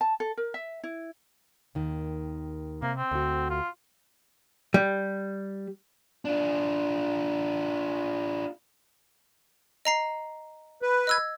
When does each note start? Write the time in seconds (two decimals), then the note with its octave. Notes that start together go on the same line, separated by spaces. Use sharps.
0.01 A5
0.20 A4
0.37 A#4
0.54 E5
0.83 E4
1.75 D#2 D#3
2.82 C3 A#3
2.97 C4
3.11 D2 F#4
3.50 F4
4.74 G3
6.25 D4 F4
9.85 D#5 A#5 C7
10.82 B4
11.07 D#5 E6 G#6